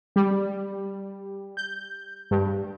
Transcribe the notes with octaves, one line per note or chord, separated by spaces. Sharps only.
G3
G6
G2